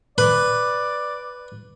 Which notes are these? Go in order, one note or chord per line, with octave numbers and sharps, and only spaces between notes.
B4 D5